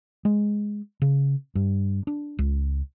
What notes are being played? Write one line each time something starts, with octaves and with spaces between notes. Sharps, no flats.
G#3
C#3
G2
D4
C#2